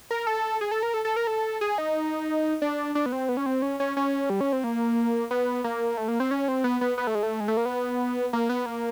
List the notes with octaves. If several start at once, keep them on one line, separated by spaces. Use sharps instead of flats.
A#4
A4
G#4
A4
A#4
A4
A4
A#4
A4
G#4
D#4
D4
D4
B3
C4
B3
C#4
C4
C#4
C#4
C#4
G3
C#4
C4
A#3
B3
A#3
A3
A#3
C4
C#4
C4
B3
B3
B3
A3
G#3
A3
G#3
A3
A#3
B3
A#3
B3
A#3